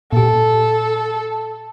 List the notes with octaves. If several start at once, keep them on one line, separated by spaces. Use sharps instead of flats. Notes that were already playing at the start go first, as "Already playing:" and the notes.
A#2 G4 A4